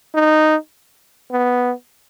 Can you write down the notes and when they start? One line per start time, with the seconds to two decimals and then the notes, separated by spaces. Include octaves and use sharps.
0.15 D#4
1.32 B3